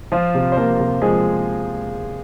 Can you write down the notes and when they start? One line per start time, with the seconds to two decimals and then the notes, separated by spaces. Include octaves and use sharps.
0.12 F3 F4
0.35 C3
0.52 C5
0.57 F3 A#3 A#4
0.80 C3
1.02 F3 G#3 G#4